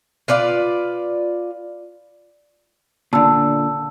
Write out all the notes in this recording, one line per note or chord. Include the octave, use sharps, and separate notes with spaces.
F4 B4 D5 F5
A#2 D3 A5 E6